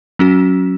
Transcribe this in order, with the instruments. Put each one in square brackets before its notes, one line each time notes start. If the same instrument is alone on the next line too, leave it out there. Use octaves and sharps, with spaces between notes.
[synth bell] F#3 C#4 F#4